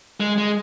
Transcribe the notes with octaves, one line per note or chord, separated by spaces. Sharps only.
G#3
G#3